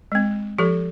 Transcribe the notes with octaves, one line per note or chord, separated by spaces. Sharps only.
G#3 C4
F3 G4 A4